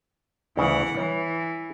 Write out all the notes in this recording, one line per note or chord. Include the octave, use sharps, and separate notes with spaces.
D2 C#3 E3 F#5
E3 C#5